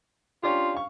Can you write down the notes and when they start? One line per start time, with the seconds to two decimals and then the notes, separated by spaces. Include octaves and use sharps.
0.43 C#4 D4 F4 G4
0.75 F5 C#6